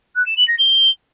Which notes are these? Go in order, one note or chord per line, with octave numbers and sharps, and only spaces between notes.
F#6
E7
F#7
A#6
G7